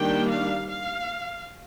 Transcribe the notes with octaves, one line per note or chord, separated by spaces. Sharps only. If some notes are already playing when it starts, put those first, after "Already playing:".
Already playing: D#3 G3 A#3 D4 G5
F5
F5